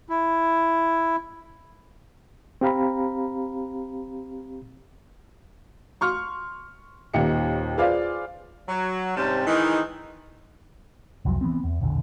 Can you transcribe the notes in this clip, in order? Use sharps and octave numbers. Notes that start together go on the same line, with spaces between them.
E4
C4 G4 F5 A#5 B5
C6 C#6 F6
D#1 D#2 D#3 G4 D#5 C#7
F4 G#4 B4 C5 D5 F5
F#3
G#2 C3 G3 C#4 G5 A5
D#3 E3 G#3 D#4
F1 C2 F2 F#3
E3 G3 B3 C4
E2
E1 A#1 E2 D3